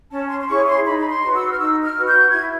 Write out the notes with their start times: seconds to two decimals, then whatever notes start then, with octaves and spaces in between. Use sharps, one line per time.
0.11 C#4 A5
0.29 C6
0.40 C6
0.47 E4 G#4 C#5 C#6
0.67 C6
0.84 D#4 B5
0.99 B5
1.10 C6
1.22 F#4 B4
1.34 E6
1.51 F6
1.58 D#4 E6
1.83 F6
1.95 F#4 B4
2.08 G6
2.31 E4 G#6